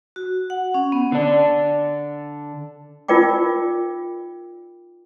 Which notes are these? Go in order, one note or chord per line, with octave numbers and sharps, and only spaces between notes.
F#4
F#5
C#4
B3
D3 D4
D#4 F4 A#4 D5 G5 D6